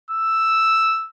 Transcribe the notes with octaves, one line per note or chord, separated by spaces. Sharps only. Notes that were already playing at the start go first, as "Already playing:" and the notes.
E6